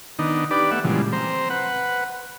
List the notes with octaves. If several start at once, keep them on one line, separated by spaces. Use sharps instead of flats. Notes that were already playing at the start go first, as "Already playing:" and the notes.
D#3 B3 D4 D#4
D4 G4 B4 D5
A3 B3 E5 F#5
A#2 C#3 E3 F3 G3 G#3
C4 C5 A#5
B4 F#5